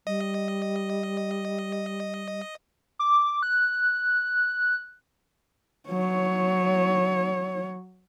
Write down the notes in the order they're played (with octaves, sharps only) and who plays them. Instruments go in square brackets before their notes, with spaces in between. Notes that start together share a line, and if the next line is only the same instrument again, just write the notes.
[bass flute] G3 [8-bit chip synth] D#5
[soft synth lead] D6
F#6
[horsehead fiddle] F#3 C#5